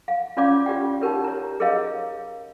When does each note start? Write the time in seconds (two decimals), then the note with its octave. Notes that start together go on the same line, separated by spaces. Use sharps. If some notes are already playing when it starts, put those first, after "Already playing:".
0.08 F5
0.37 C#4 F4 C#5 D5 F5 D6
0.66 F4 G4 D5 G5
1.01 D#4 G4 A#4 C#5
1.24 C#5 A#5
1.60 G#4 A#4 C#5 D#5 F5